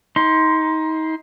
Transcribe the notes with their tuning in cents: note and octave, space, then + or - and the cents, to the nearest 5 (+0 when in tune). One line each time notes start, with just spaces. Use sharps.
D#4 +30 C6 +0